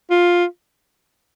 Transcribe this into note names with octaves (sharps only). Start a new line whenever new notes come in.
F4